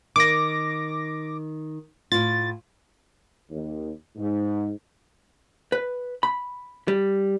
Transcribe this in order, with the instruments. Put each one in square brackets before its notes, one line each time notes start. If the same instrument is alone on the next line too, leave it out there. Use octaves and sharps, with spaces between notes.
[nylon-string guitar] D#3 [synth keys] D6 A#6
[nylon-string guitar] A2 F4 [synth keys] A6
[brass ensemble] D#2
G#2
[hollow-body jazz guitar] B4
B5
G3